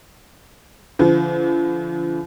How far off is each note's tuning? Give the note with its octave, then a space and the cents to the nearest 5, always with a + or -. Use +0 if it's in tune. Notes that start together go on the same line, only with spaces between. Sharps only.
D3 -45 F3 -45